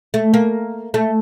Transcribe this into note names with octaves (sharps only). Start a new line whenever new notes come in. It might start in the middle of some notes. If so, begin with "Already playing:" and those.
A3
A#3
A3